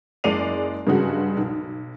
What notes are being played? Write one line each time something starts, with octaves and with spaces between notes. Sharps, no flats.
F#1 G#3 D5 C7 D#7 F7
G2 C#3 G#3 F#4
B1